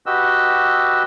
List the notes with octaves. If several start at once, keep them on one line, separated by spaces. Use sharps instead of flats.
F#4 G4 B4 D#5 E6